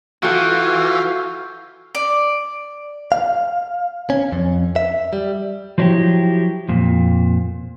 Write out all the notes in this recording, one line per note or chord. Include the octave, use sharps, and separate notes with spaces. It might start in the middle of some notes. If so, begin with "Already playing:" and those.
E3 F4 F#4 A4 F#5 C#6 G6
D5
F5
C#4
F2
E5
G3
F3 F#3 D4 E4 G4
F2 A#2